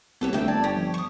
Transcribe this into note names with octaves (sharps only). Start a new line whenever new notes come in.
C2 B3 C4 G4 A4 B4 C#5
D2 A3 A#3 E5 G5
G1 D5 G5 A5 G#6
C#4 G4
F3
C#6 D#6